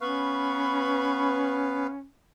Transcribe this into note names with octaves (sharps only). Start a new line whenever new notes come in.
B3 C#4 B4 F5 B5 C#6